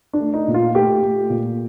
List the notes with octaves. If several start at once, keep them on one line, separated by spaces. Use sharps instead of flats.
D4
A3
D#4
A#2
F4
A3 G4
A3
A#2